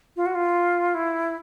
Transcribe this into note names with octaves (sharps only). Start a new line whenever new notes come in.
F4
F#4
F4
E4